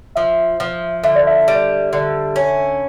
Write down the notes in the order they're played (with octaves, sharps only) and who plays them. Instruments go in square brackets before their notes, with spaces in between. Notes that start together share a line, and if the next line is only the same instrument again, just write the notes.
[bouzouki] F3 [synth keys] E5
[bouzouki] F3
[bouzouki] D3 [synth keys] E5
[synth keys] D5
E5
[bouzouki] G3
D3
C#4